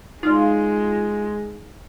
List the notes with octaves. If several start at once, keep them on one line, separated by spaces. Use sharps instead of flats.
G#3 D#4 F4 D5